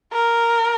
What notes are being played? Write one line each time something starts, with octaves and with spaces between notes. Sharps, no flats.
A#4